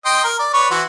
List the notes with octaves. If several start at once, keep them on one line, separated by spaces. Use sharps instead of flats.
D#5 G5 C6
A#4
D5
B4 C#5 D5
E3 F#4 C5